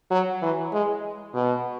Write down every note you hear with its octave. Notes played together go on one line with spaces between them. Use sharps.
F#3
E3
G#3
B2